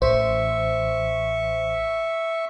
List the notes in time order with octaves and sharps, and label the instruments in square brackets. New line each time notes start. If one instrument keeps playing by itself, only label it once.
[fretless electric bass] A1 [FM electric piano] C5 [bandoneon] E5 C#6